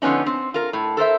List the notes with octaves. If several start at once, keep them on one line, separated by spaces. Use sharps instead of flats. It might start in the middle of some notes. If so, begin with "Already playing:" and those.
D3 F3 B3 C#4 D#4
C4
F4 A#4
A2
A4 A#4 C5 E5